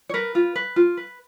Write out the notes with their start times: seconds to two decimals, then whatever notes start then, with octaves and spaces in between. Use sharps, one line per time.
0.09 C#5
0.14 A#4 B4
0.35 F4
0.56 B4
0.76 F4
0.97 B4